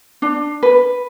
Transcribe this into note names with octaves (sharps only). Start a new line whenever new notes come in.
D4
B4